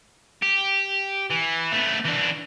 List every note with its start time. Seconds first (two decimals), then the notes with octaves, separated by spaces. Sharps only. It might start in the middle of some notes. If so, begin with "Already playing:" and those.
0.42 G4
1.30 E3
1.72 A3 B3
2.05 E3 D4